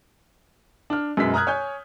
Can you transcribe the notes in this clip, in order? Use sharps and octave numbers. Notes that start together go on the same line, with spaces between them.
D4 F6
F#2 B2 G#3 B6
A#5 D#6 F6 F#6 G#6
C#5 G#5 G6